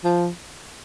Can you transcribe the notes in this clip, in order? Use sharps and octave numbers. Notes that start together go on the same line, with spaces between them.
F3